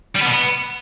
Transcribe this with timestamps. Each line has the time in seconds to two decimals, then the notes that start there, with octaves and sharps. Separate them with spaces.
0.15 G3
0.21 B3
0.26 B2
0.31 B3